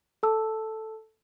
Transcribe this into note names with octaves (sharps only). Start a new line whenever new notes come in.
A4 A5 E6